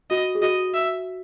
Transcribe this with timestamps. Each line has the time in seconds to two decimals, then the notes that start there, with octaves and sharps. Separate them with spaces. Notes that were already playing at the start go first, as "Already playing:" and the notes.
0.10 F#4 D#5
0.35 G#4
0.42 F#4 D#5
0.74 E5